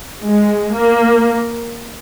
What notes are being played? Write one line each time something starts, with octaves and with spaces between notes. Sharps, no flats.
G#3
A#3